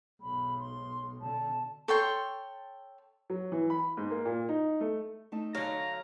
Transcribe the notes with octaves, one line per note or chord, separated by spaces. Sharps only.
B1 G#2 B5
C6
B2 D3 A5
A4 C#5 G5 C6
F#3
E3
B5
G#2
A#3
A#2
D#4
A3
A3 D#4 A5
D3 F#3 F5 A#5